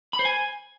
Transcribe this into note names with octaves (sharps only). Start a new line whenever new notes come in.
B5
C5
G#5